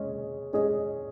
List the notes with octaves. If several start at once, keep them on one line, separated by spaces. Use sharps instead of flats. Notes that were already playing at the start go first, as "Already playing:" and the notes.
Already playing: G#3 C#4 G#4 D#5
G#3 C#4 G#4 D#5